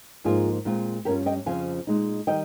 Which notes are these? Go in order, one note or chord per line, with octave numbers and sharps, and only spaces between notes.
G#2 F3 A#3 D#4 F4 G#4
A#2 G#3 C4 F4
G2 G3 C#4 F4 G4 A#4
D#5 G5
F2 C#3 F3 C4 F5 G#5
A#2 G#3 D#4
D#3 G3 D#5 G5